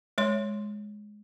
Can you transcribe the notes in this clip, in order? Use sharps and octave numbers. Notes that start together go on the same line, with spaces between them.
G#3 C#5 C6